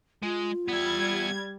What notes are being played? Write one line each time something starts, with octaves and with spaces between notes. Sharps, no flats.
G#3 F4
G3 B3 E5 G#6